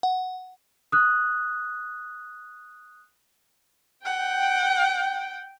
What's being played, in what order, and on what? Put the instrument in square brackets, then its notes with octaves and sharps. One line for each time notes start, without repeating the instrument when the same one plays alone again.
[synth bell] F#5
[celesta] D#6 F#6
[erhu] F#5 [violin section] G5